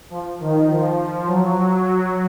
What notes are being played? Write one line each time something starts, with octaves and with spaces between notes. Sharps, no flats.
F3
D#3
F3
F#3